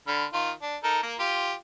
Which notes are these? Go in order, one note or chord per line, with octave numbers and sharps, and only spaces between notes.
D3 B5 F6
D#3 F4
D4
D#4 A4 A#4
A#3 A#4
F4 G4